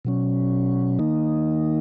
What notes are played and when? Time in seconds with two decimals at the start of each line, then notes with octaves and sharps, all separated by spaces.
0.05 B2 F#3 C#4
0.99 D#3 A#3 D#4